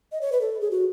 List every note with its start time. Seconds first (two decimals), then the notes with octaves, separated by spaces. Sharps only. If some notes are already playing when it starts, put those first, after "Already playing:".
0.12 D#5
0.21 C#5
0.32 B4
0.41 A4
0.61 G#4
0.71 F#4